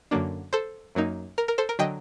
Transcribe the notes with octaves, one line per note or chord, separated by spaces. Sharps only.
F#2 D3 F#3 A#3 D4
A4 C5
F#2 F#3 A#3 D#4
A#4
A#4
A4 C5
A#4
D3 F#3 D#5 G5